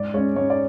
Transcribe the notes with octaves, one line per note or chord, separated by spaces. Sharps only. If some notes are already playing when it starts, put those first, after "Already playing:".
Already playing: G#2 D5
G#3 C#4 C#5
G#2 C#5
D5